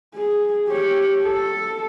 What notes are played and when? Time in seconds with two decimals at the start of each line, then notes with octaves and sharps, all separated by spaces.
0.15 G#4
0.69 G4 C#5
1.23 A4